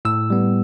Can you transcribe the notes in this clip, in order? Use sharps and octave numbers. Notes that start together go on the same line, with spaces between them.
A2 E6
G3 B3